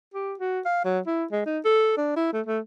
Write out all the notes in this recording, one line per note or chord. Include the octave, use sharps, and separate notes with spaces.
G4
F#4
F5
F#3
E4
G#3
D#4
A4
D4
E4
A3
A3